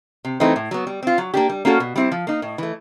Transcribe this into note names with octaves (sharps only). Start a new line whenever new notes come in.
C3
E3 A3 C4 D#4
A2
F#3 B3
G3
C4 F4
F#3
A#3 D4 G4
G3
A#3 C#4 F#4 A4
B2
G3 C4 E4
F3
A#3 D#4
A2
E3 A3